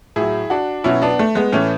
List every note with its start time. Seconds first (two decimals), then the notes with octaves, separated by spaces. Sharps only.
0.16 A2 F#3 E4 G#4
0.50 D4 F#4
0.84 B2 F#3 C#4 E4
1.02 B3 D4
1.19 A3
1.35 G#3 B3
1.52 A2 E3 A3 C#4